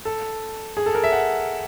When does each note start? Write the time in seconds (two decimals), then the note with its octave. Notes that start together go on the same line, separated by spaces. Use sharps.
0.05 A4
0.77 G#4
0.86 A4
0.95 A#4
1.04 E5
1.12 F#5